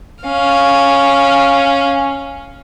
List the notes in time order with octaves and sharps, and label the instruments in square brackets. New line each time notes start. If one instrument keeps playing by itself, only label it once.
[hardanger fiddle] C#4 F5